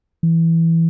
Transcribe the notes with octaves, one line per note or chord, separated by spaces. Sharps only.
E3